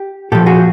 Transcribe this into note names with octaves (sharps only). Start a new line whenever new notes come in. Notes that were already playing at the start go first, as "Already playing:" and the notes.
Already playing: G4
A#2 F3 G4 A4
F#4 G#4